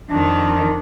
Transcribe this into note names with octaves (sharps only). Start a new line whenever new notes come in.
F2 D#3 D4